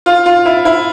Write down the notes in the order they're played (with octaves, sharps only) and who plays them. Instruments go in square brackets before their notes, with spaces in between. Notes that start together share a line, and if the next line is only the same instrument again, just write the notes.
[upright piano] F4
F4
E4
E4